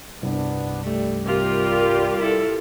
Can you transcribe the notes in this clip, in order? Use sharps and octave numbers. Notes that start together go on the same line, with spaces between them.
C2 G2 B2 B3 D4
G3 A3
C3 F4 G4 A#4
E4 A4